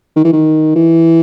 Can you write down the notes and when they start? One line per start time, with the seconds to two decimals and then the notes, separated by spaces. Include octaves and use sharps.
0.16 D#3
0.24 E3
0.33 D#3
0.75 E3